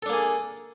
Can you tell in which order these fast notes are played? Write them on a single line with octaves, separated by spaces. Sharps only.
A4 D4 A#3 G#4